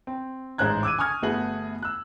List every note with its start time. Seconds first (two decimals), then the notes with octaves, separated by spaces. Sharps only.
0.07 C4
0.58 A1 G#2 C5 A#5 F#6 G#6
0.83 D6 E6 G#6 D#7
0.99 G#5 C#6 D#6 F6 G#6
1.22 G1 A3 B3 F#4 G#4 F#7
1.83 E6 F#6